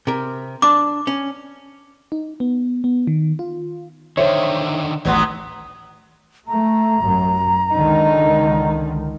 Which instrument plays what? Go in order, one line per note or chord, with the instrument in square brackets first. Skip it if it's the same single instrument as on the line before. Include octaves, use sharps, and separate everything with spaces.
[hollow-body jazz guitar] C3 A#4
[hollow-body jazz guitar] D4 [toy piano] D6
[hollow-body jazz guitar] C#4
[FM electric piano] D#4
B3
B3
D#3
F4
[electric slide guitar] D3 D#3 [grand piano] C5 E5 [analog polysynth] C#5
[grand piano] A1 C6 [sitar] D#2 F#3 B3
[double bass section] A3 [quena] A#5
[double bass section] A1 F#2
[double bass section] C#2 D3 D#3 [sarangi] D#4